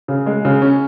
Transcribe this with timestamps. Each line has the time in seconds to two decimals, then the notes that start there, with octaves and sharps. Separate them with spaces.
0.08 C#3
0.26 G#3
0.45 C#3
0.62 C#4